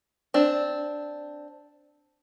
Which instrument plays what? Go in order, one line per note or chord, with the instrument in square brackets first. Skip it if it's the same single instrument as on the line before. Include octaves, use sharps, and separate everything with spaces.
[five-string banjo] C4 D4